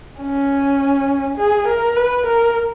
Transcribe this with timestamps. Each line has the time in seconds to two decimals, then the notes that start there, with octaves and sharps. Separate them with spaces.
0.21 C#4
1.38 G#4
1.68 A#4
1.96 B4
2.26 A#4